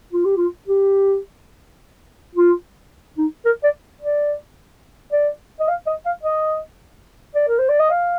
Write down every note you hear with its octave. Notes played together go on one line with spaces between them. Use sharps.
F4
G4
F4
G4
F4
D#4
A#4
D5
D5
D5
D#5
F5
D#5
F5
D#5
D5
A#4
C5
D5
D#5
F5